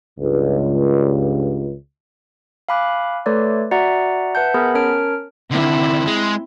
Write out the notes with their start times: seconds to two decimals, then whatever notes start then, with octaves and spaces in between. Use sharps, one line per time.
0.19 C#2 G2
2.69 F5 G#5 B5 D6 F#6
3.26 A3 A4 B4 C#5 D5 C6
3.71 F#4 D5 E5 F#5 A#5
4.35 B4 E5 F#5 A5 G6
4.54 B3 G#4 A#4 B5 G#6
4.74 C#4 A#4 C#5 A5 F6 D7
5.51 D3 D#3 C4 E4
6.06 G#3